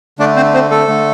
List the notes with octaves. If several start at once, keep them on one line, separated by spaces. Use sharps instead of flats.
D3 A3 D4 D5
C4 C5
C4 C5
A3 A4
D3 A3